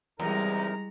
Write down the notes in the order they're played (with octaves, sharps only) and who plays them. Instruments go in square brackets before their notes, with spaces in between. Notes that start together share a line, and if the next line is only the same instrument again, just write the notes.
[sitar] E2 [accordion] C3 D#4 A#4 [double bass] G3 [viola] G#3 A#5